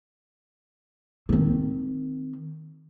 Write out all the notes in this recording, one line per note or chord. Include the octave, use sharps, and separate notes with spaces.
D#3 C4